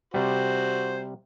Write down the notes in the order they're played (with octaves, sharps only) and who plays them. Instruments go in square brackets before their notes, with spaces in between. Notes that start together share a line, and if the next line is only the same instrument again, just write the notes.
[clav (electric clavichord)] C3 G3 [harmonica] F#4 C5